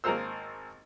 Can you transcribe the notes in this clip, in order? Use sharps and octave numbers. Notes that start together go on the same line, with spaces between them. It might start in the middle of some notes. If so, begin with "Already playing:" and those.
G#1 A#3 G#4 A#4 C5 E6